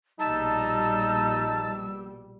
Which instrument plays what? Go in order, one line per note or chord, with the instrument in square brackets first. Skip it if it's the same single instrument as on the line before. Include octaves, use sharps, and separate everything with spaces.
[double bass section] A#1 B2 G3 [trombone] D#4 [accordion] A5 [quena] E6